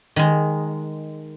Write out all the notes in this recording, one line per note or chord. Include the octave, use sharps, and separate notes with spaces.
D#3 G#3